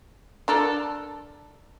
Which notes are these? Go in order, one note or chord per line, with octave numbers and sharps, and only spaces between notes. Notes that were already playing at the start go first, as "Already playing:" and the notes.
D4 A4 A#4